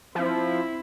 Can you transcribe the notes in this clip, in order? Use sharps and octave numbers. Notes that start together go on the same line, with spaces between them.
F3 C4 E4